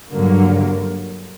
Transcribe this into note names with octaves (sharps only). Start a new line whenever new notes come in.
G2 D3 F#3 A#3